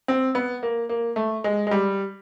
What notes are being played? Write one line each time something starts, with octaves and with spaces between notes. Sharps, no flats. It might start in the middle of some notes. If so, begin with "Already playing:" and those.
C4
B3
A#3
A#3
A3
G#3
G#3
G3